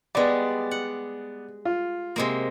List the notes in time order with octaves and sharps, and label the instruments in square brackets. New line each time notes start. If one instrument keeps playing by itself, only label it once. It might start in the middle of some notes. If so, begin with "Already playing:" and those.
[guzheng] G3 G#3 [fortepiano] B3 D5
[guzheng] F#5
[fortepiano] F4
[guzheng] C3 G#3 A#3